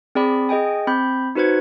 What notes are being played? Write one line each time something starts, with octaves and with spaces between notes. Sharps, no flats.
C4 G#4 D5 B5
G#4 D#5 G5 G#5
C4 B5 G6
D#4 F#4 B4 C5 G#6